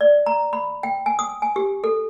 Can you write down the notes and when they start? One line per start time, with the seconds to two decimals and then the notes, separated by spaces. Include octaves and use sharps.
0.01 D5
0.26 A#5
0.53 B5
0.83 G5
1.06 G#5
1.19 D#6
1.42 G#5
1.56 G4
1.84 A4